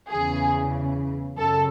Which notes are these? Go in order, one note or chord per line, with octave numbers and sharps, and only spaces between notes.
E2 C#3 E3 G#4
F#2 C#3 A4